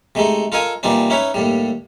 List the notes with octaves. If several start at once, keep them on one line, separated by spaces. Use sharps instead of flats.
C3 G#3 A3 D#4
F4 A4 A#4 D#5 G#5
A#2 E3 G3 C4 D4 D#4
C#4 D#4 E4 B4 C#5
D#2 A2 G3